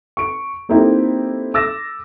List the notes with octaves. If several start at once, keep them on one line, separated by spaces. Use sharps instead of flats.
C#6 D7
A#3 C4 D#4 E4 G4 A4
D6 E6 A6 A#6 E7